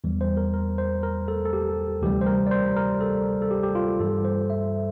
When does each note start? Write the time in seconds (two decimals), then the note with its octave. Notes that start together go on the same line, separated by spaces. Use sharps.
0.04 E2 E3 G3
0.21 C5
0.37 A#4
0.54 A#4
0.78 C5
1.03 A#4
1.28 A4
1.45 A4
1.53 G4
2.02 D2 C3 E3 G3 G4
2.21 C5
2.26 A#4
2.47 D5
2.51 C5
2.76 A#4
3.01 A4
3.42 A4
3.51 G4
3.63 G4
3.75 F4
3.88 G4
4.00 G2 E3 G3 A4
4.25 C5
4.50 E5